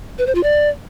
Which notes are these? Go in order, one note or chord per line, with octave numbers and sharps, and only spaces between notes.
B4
C5
F4
D5